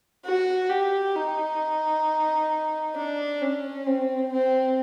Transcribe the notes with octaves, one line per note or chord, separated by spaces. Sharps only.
F#4
G4
D#4
D4
C#4
C4
C4